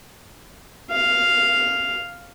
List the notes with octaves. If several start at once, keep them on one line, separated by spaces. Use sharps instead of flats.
F5